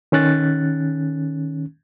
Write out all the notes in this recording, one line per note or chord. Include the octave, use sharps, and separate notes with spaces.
D#3 C#4 F#6 A6